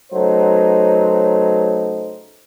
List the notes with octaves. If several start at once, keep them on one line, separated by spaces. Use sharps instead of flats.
C#3 F#3 A3 D#4 B4 C5